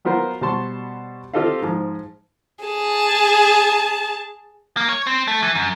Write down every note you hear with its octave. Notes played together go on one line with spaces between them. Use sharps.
F#3 B3 F4 A#4 C5
B2 G3 C5 A5 C6 C#6
C4 F4 G4 A4 D#5 F5
G#2 F3
G#4 A5
A#3
C#5
C4
A3
E3
F#2